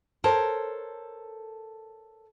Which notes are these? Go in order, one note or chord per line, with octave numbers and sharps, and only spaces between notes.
A4 A#4 C5 C#5 A5